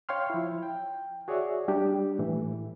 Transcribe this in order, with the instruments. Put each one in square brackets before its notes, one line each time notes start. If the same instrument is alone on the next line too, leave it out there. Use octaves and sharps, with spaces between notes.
[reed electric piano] C#5 F5 G5 C6 F6
F3 E4
G5
F#4 G#4 C#5 D5 E5
G3 D4 G4
A2 E3